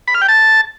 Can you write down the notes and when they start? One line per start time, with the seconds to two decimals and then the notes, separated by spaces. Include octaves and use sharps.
0.08 B5
0.15 F6
0.21 G5
0.28 A5